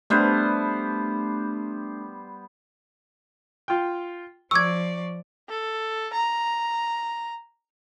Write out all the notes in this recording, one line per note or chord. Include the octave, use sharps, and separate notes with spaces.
G3 A3 B3 D4 C5
F4 G5
F3 D5 C#6 D6 E6 G#6
A4
A#5